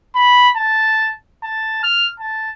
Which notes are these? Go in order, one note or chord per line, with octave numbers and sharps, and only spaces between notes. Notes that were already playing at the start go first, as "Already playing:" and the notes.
B5
A5
A5
F6
A5